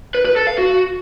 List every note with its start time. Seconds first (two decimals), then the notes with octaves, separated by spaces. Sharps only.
0.14 B4
0.25 B4
0.36 A4
0.47 F5
0.58 F#4